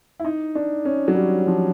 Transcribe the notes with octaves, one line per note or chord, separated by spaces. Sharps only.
E4
D#4
D4
C#4
F#3
G3
F3